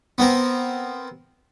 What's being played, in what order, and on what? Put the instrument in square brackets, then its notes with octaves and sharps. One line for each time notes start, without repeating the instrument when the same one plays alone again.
[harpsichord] B3 C4 A#4